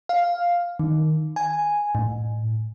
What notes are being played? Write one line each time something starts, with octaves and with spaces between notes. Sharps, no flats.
F5
D#3
G#5
A2